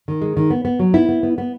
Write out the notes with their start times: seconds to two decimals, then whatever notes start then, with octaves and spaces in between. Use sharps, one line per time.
0.08 D#3
0.22 G#3
0.37 D#3
0.50 B3
0.65 B3
0.79 F#3
0.94 B3 E4
1.09 B3
1.23 B3
1.38 B3